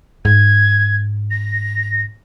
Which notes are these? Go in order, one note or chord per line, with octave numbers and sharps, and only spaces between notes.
G#2 G#6
A#6